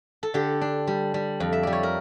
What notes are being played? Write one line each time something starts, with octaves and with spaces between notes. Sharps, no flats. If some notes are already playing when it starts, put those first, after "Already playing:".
A4
D3 G4
D4
G3
G3
F2
E5
G3 D5
C#5
A#4